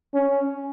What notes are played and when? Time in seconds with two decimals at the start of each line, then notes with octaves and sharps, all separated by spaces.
0.14 C#4